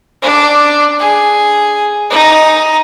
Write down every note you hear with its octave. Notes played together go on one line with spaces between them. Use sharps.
D4
G#4
D#4